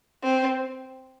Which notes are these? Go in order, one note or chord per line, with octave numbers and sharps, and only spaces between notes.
C4